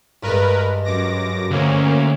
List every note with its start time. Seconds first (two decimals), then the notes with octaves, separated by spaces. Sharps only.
0.23 G2 G#3 A#4 B4
0.84 F#2 D6 A#6
1.51 D2 A#3 C#4